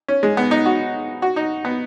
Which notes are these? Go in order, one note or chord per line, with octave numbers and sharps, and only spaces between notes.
C#4
G#3
B3
D#4
F#4
F#4
D#4
B3